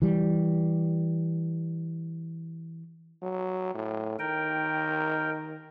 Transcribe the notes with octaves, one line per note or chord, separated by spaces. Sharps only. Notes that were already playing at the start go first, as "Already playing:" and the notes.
E3 G3
F#3
A2
D#3 A#4 G5